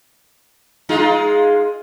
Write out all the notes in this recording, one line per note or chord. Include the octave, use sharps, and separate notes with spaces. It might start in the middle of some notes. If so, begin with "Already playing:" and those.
G#3 D#4 F4